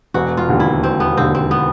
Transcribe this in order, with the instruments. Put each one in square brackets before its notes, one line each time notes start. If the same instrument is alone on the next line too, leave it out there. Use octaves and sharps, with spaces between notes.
[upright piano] E1 [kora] F#4
[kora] F4
[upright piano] D#2 D3
[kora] E4
[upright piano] E1 [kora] C4
[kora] B3
[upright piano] D#2 D3 [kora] C4
[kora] C4
B3